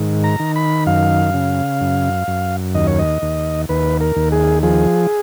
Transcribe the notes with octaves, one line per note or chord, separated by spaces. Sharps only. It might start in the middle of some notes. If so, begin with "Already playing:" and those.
Already playing: G#2 D#3
A#5
D#3
B5
F#2 F5
C#3
F#2
F#2
D#2 D#5
C#5
D#5
D#2
D#2 B4
A#4
D#2
G#4
F3 G#4